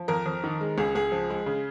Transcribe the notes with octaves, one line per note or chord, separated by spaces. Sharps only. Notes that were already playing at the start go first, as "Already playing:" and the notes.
Already playing: F3
F2 A#4
F2
D#3
G#3
C#2 G#4
C#2 G#4
F3
G#3
C#3